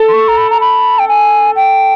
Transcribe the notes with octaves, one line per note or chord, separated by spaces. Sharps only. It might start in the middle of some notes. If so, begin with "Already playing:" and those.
Already playing: A4
C6
C#6
A#5
B5
A#5
B5
G5
G#5
G5